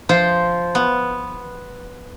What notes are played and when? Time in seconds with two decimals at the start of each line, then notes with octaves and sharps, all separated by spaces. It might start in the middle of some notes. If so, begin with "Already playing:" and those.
0.09 F3 F4 C5
0.75 B3